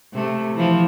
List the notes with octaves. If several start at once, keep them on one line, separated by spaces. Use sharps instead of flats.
C3 A3
E3 F3